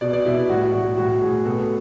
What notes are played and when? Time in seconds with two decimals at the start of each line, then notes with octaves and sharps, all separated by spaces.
0.01 B2 D5
0.13 D5
0.25 B2 E4
0.37 E4
0.49 A2 F#4
0.73 A2 F#4
0.97 A2 F#4
1.22 A2 G#4
1.45 B2 A4